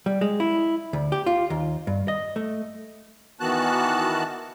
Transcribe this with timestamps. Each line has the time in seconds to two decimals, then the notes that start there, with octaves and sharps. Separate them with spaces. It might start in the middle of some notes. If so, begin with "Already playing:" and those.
0.06 G3
0.21 G#3
0.40 E4
0.93 D2
1.12 G4
1.26 F4
1.50 D#2
1.87 G2
2.08 D#5
2.36 A3
3.40 D#3 E3 B3 F#4 A5 F#6